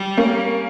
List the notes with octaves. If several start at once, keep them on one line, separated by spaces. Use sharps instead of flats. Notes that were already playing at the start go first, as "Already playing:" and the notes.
Already playing: G3
A#3 C#4